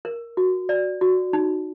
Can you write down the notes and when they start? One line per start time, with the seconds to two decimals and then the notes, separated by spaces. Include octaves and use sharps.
0.05 A#4
0.37 F#4
0.69 D5
1.01 F#4
1.33 D#4